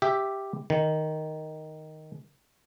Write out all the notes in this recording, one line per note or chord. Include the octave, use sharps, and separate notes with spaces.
G4 E5
D#3